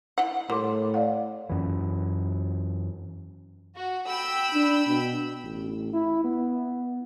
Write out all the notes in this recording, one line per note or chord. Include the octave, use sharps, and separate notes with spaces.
E4 F#5
A2 G3 A#4 C6 D6
D5 F5 F#5
F#2 E3
F#4
G5 B5 E6
D4
B2
A1
E4
B3